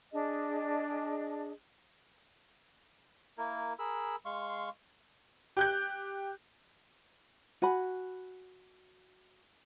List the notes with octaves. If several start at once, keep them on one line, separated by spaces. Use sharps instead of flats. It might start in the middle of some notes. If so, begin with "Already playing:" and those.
D4 G#4 D#5
A#3 E4 A#4
G#4 A#4 B5 E6
G#3 F5 C6 C#6
G4 F#6 G6
F#4 G#5 B5